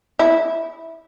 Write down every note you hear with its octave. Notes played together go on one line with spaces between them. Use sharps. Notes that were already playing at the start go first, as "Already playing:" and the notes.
E4